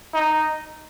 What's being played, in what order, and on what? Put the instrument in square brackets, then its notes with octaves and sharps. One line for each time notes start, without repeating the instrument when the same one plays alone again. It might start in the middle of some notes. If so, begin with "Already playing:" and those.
[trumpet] D#4